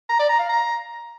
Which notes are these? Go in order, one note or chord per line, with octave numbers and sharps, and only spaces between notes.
A#5
D5
A#5
F5
A#5